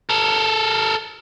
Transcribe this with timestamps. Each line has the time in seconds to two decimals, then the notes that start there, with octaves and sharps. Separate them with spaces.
0.10 A4 A#4